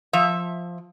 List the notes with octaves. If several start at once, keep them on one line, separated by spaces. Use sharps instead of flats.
F3 E5